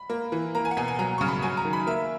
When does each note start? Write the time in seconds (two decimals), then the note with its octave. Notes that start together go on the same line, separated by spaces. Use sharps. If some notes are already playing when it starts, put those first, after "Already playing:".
Already playing: B5
0.10 A#3
0.32 E3
0.55 A#3 A#5
0.65 G#5
0.71 F#5
0.77 B2 G#5
0.88 G#5
0.99 F#3 A#5
1.18 C#3 C#6
1.28 B5
1.42 F#3 G#5
1.57 A#5
1.65 D#3
1.73 B5
1.87 A#3 E5